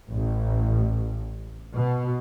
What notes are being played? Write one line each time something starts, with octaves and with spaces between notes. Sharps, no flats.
A1
B2